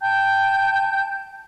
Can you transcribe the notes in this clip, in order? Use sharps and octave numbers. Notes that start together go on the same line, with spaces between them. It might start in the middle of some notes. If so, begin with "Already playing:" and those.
G5 A5 G6